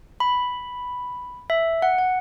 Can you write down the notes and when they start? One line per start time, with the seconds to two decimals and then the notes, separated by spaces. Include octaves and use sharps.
0.20 B5
1.50 E5
1.82 F#5
1.98 F#5